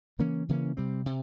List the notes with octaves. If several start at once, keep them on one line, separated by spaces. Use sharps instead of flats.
C#3 E3 A#3 C#4
C#3 E3 A#3 C#4
C3 G3 C4
C3